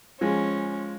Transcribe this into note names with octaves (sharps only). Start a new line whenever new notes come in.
F3 G#3 C#4